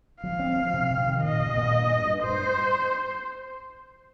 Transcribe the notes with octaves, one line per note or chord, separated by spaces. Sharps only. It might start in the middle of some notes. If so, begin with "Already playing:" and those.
F3 F5
C4
F3
C3
C3
D#3
A#2 D#5
A#2
A#2
G2
G2
G2
G2 C5